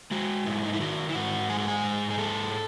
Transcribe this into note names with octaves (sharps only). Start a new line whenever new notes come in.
G#3 F#4
G#2 E4
D#4
E4
D#3 F#4
E4
G#2 F#4
G#3 G#4
F#4
G#4
G#2
G#4
G#3 A4